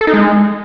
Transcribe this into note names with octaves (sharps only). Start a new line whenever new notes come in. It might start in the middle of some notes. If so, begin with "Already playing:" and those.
A4
D#4
G#3